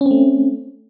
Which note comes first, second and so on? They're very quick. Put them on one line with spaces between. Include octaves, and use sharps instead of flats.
C#4 C4 A3